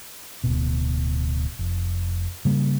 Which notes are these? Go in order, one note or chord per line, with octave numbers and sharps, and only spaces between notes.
D1 G#1 B2
F1
C#3 G3 A#3